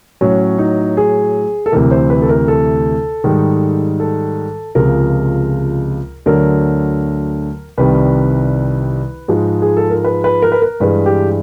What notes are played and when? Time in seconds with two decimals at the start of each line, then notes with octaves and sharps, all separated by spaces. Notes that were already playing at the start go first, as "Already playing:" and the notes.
0.21 A2 F#3 C#4
0.58 D#4
0.97 G#4
1.66 A4
1.72 D2 C3 E3 A#4
1.91 C5
2.10 B4
2.22 A4
2.29 A#4
2.48 A4
3.24 G#2 D#3 G3
4.00 A4
4.75 C#2 C3 F3 G#3 A#4
6.26 D2 D3 F#3 A#4
7.78 C2 C3 D#3 G3 B4
9.28 G#2 F3 G#3
9.62 G#4
9.77 A4
9.90 A#4
10.05 B4
10.24 B4
10.42 A#4
10.52 B4
10.62 A#4
10.80 G2 E3 G#3 B4
11.06 G4